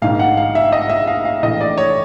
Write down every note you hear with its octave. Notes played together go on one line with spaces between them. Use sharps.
A#1 G#2 D#3 F5
F#5
F5
E5
D#5
E5
F5
F5
A#1 A2 E3 D#5
D5
C#5